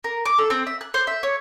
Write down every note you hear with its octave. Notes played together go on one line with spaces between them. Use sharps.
A#4
D6
A4
C4
E5
F#6
C5
E5
C#5